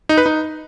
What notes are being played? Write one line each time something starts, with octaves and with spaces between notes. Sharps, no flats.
D#4
B4
D#4